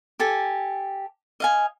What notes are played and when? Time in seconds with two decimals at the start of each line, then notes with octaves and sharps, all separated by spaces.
0.20 G4 A4 G#5
1.40 D#5 F5 G#5